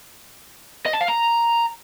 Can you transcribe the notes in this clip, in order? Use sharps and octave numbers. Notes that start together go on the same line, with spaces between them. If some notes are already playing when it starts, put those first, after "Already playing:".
D#5
A5
F5
A#5